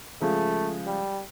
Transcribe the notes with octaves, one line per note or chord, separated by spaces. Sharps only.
C#3 F3 G#3 A3
G3